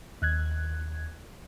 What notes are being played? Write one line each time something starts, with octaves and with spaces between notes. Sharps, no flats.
D#2 F#6 G#6